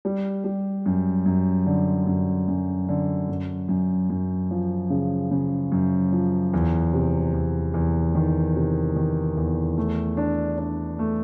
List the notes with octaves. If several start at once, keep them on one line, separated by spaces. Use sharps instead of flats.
G3
G3
F#2
F#2
D3
F#2
F#2
D3
F#2
F#2
F#2
F3
C#3
C#3
F#2
F3
E2
C3
E2
E2
D#3
C3
D#3
E2
A3
D4
D4
A3